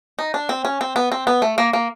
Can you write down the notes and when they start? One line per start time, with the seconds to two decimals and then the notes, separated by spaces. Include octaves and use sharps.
0.19 D#4
0.34 D4
0.49 C4
0.65 C#4
0.81 C4
0.96 B3
1.12 C4
1.27 B3
1.42 A3
1.58 A#3
1.73 A#3